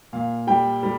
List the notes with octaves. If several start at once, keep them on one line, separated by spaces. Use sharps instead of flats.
A#2 F5
G3 G5
G3